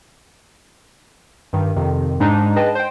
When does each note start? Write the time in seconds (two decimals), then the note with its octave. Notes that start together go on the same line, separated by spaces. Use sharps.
1.53 G2 D#3
1.76 F2 C3 D#3
2.20 G#2 G#3 D4 D#4
2.56 G#4 B4 D#5 G5 A5
2.75 C5 G5